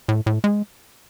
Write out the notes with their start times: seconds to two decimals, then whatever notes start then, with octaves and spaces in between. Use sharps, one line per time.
0.09 A2
0.26 A2
0.44 G#3